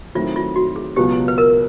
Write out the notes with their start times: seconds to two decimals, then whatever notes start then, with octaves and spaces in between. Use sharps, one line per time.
0.15 D#3 F#3 A3 C4 E4 F4
0.36 F4
0.56 F#4
0.76 G#4
0.96 C#2 B2 F#3 B3 G4
1.28 B4
1.38 A#4